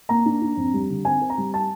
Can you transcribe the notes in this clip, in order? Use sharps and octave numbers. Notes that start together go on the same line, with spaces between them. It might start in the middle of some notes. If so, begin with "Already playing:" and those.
A#3 A#5
D4
D4
F2
G3
D3
C4 G#5
C4
A#5
G3
A5